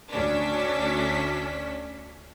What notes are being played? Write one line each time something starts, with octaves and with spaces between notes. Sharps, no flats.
D2 C#4 D4 B6